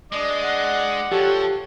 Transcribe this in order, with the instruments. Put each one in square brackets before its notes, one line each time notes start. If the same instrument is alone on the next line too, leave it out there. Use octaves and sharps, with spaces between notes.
[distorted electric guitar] G#3 [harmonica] D4 D5 D#5
[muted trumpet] F#5
[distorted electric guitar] F3 [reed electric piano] G4 [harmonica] A4 C#5